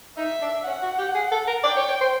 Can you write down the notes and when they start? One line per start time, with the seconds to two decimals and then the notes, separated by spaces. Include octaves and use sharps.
0.17 D#4 E5
0.42 D4
0.65 C#4 F#5
0.82 F#4
0.99 G4
1.15 G#4
1.32 A4
1.47 A#4
1.64 D5 G5
1.77 C#5
1.89 C#5
2.01 C5